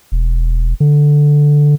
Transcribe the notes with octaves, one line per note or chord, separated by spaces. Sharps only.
E1
D3